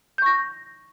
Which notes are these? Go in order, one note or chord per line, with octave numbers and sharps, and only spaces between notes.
C#6 G6 A#6